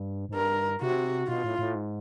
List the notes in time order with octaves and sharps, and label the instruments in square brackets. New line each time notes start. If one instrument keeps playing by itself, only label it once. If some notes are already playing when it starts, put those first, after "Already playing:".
Already playing: [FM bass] G2
G#2
[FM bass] G2 [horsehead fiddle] A#4
[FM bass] C3 [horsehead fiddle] F#4
[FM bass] B2 [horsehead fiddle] F4
[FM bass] A2
A2
G#2